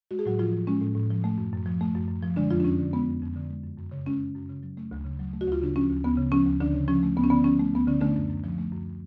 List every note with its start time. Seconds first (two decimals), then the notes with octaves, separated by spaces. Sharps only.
0.11 G#3 F#4
0.19 G#4
0.26 A2 F#3 F#4
0.39 A2 F3 F4
0.53 F3
0.67 G#3 C#4
0.81 A2
0.95 A2
1.10 F3
1.24 A3
1.38 F#2
1.53 F#2
1.66 F3
1.81 A3
1.95 F#2
2.08 F#2
2.23 F3
2.36 D3 G#3 D4
2.50 F2 F3 F4
2.60 D4
2.64 F2 C#4
2.79 D3
2.93 G#3 B3
3.08 F2
3.22 F2
3.35 D3
3.50 G#3
3.64 F#2
3.78 F#2
3.91 C#3
4.06 G#3 C#4
4.20 F#2
4.35 F#2
4.49 C#3
4.63 F#3
4.77 A3
4.91 D2
5.05 C#3
5.19 F#3
5.33 A3
5.41 F#4
5.47 D2 F4
5.61 C#3 D4
5.76 F3 C#4
5.90 D2
6.04 D2 B3
6.17 C#3
6.32 F3 C#4
6.46 D2
6.60 D2 D3 D4
6.74 C#3
6.88 F3 C#4
7.03 A3
7.17 D2 B3
7.24 C#4
7.30 D3 B3
7.44 F3 C#4
7.59 A3
7.73 D2 B3
7.87 D3 C#4
8.01 D3 A3 D4
8.16 F#2
8.30 F#2
8.44 F3
8.58 A3
8.72 F#2